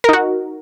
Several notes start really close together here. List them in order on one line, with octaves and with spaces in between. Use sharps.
A#4 D#4 F#4